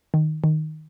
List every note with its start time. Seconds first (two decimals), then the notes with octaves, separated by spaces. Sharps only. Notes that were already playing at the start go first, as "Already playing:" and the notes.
0.14 D#3
0.44 D#3